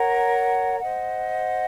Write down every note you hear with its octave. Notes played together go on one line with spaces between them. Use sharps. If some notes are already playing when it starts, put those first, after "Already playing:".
Already playing: A#4 C#5 F#5 A#5
C5 D#5 F#5